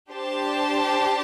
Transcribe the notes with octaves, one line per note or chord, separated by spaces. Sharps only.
D4 G4 C5 A5